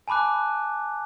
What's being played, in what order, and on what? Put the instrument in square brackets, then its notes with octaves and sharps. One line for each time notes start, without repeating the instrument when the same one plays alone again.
[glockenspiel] G#5 A5 B5 D6 F#6